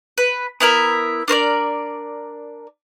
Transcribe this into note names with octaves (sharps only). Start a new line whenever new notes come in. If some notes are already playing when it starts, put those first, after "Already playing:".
B4
B3 E4 A#4 E5
D4 A#4 C5 D5